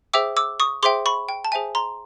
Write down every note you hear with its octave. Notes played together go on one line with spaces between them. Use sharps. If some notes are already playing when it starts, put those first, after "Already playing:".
G#4 C5 E5 G5 D6 E6
D6 E6
C#6 D#6
G#4 C5 E5 G5 C6 D6
B5 C#6
G5
A5
G#4 C5 E5 G5 G#5
A#5 C6